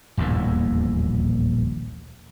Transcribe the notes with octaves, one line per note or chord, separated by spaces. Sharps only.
D#1 A#1 E2 A2